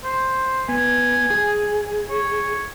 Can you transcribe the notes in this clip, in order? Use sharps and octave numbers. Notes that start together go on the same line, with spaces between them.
C5
B3 G#5
G#4
C#5